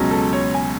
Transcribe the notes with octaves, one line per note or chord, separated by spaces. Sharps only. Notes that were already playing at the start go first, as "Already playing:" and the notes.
Already playing: C#2 B2 F#3 C#4
A4
C#5
G#5